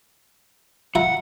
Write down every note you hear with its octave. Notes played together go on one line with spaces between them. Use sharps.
F4 E5 F#5 A#5